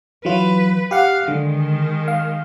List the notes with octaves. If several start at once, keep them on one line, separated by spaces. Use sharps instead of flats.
E3 F#3 F4 B4
G4 F5 F#5
D3 D#3 G#3
F5